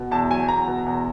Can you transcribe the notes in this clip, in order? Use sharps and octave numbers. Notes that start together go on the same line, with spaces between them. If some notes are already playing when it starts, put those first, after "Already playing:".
Already playing: B2
E2 A5
F#3 G#5
E2 A#5
B2
E2